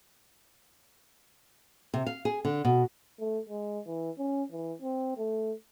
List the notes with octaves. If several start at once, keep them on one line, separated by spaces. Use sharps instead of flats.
C3
F5
G#4
D3
B2
A3
G#3
E3
C#4
E3
C4
A3